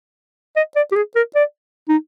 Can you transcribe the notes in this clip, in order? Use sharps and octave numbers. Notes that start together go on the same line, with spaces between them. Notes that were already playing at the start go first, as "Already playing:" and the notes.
D#5
D5
G4
G#4
A#4
D5
D#4